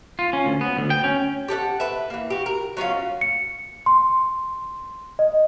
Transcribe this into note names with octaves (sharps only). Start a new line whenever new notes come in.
F4
C#4
D2
B3
D2
G5
C#4
G4 A4 D5 F#5
B4 E5
E3 A#3
F#4 G4
A#4
F#3 C#4 F4 F5
C#7
C6
D#5